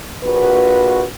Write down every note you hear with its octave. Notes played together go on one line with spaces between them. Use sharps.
A#1 F#4 B4